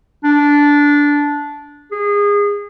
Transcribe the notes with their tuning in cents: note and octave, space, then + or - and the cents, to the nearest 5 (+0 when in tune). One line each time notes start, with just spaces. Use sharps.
D4 -10
G#4 -25